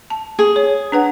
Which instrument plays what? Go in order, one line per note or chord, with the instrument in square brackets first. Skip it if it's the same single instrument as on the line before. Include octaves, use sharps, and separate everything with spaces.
[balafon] A5
[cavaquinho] G#4
[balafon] C#5
D4 B4 F#5